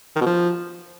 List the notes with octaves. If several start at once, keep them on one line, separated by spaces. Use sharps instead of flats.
D#3
B2
F3